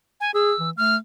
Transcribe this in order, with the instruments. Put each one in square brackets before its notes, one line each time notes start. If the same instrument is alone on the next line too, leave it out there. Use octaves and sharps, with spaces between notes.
[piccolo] G#5
[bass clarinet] G#4 [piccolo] E6
[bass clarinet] E3
[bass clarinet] A3 [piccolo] F6